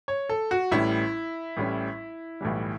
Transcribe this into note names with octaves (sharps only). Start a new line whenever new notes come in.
C#5
A4
F#4
A1 A2 G3 C#4 E4
A1 A2 G3 C#4
B1 A2 E3 G3